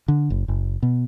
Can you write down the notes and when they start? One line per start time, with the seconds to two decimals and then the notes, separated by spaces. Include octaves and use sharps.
0.08 D3
0.30 F#1
0.48 F#1
0.83 B2